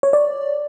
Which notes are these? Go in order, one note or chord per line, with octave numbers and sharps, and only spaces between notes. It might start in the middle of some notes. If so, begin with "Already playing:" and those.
C#5
D5